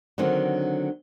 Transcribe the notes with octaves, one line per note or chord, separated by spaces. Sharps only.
D3 D#3 F#3 C4 C#4